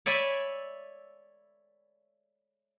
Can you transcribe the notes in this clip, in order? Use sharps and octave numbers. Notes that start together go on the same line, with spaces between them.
C#5 D5 E5 G#5 B5